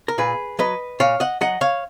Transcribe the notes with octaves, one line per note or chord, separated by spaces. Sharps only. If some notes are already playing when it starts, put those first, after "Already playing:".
A#4
A#2 G#4 B4
F#3 B4 D#5
A#2 C#5 F5
D#5 F#5
F#3 D#5 F#5
C#5 F5